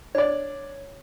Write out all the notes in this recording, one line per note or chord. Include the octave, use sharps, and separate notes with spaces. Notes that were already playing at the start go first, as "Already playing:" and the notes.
D4 C#5 D5